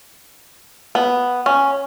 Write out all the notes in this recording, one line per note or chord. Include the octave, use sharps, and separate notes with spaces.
B3
C#4